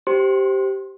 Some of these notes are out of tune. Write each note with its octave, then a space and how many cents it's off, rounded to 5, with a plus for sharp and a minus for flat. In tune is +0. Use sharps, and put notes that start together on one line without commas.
G4 -10 C5 +0 C6 +15